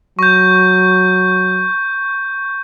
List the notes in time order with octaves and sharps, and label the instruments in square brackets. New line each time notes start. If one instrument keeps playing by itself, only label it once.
[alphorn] F#3 [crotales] C#6 G6